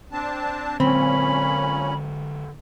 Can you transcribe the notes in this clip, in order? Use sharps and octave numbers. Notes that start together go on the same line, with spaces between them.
C4 D4 A5
A#2 D3 F#3 G#3 C4 C#4 B5